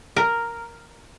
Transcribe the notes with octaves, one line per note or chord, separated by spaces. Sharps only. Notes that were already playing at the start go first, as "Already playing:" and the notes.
A#4